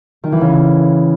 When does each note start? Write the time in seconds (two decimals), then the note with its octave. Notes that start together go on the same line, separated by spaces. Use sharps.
0.24 D#3
0.32 E3
0.41 C#3